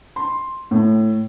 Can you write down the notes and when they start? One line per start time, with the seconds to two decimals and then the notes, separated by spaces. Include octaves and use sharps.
0.16 C6
0.71 A2